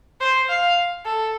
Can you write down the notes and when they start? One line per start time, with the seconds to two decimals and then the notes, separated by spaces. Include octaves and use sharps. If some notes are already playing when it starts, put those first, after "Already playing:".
0.21 C5
0.49 F5
1.06 A4